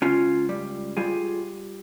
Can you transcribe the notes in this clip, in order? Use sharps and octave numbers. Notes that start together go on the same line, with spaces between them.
C#2 C#4 F4
G3
G3 F4 G#4